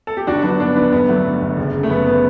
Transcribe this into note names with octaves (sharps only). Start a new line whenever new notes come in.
A4
G4
G1 D4 F#4
F#3 B3 D4
G2 B3 D4
G1 B3 D4
G1 B3
F#3 A3
G2
G1
F#1
C#3
A3
F#2 B3
B3